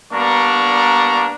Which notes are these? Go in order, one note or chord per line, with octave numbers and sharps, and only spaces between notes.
G3 A#3 B3 D4 A#5 C#6